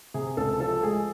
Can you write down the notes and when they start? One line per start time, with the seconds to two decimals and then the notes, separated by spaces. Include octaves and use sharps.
0.14 C3 G#4
0.37 C#2 A4
0.60 F3 A4
0.83 G#3 G#4